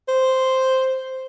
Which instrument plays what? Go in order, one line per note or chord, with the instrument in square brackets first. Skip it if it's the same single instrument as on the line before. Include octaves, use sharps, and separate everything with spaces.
[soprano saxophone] C5